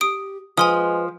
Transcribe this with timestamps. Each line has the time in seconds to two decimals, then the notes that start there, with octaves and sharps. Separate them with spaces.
0.01 G4 D#6 D7
0.58 F3 G#3 B4 G#5 C6 D#6